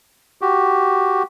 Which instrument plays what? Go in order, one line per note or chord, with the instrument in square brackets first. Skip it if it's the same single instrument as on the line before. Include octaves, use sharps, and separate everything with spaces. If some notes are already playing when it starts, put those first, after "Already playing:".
[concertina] F#4 G4